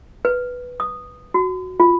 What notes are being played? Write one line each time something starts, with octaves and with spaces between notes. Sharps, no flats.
B4
D#6
F#4
F4